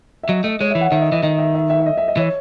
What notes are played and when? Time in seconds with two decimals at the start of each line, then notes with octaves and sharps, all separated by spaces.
0.23 E5
0.29 F#3 D#5
0.44 A3 D#5
0.60 G#3 C#5
0.70 E3 E5
0.81 F#5
0.92 D#3 E5
1.01 D#5
1.12 E3 D#5
1.23 D#3 D#5
1.38 E5
1.55 E5
1.70 E5
1.80 E5
1.86 D#5
1.97 E5
2.08 D#5
2.17 E3 C#5